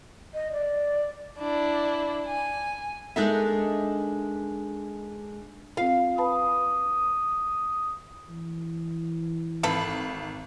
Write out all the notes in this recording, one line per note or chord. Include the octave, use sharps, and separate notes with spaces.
D#5
D5
D4 E4
G#5
G#3 D4 D#4 A4 A#4 E5
C4 F4 F5
B4 A5 B5 D#6
E3
G#1 A4 B4 B5